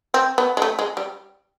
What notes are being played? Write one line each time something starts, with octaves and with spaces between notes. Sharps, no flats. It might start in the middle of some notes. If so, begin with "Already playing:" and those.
C4
B3
G#3
A3
G#3
G3